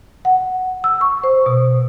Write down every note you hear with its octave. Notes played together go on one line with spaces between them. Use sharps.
F#5
E6
C#6
C5
B2